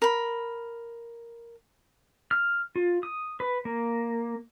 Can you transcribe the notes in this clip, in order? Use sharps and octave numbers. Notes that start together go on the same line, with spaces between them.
A#4 B5
F6
F4
D#6
B4
A#3